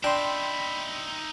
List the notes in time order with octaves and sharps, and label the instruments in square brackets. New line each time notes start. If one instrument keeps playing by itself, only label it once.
[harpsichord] D4 [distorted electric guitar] D#4 E5 [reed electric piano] G5 C6 [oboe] B5